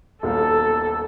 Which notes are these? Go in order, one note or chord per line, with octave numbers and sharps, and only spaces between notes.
D#1 B1 A4 F5